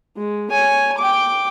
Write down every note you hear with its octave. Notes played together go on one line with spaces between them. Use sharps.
G#3
C#5 G#5
G5 D6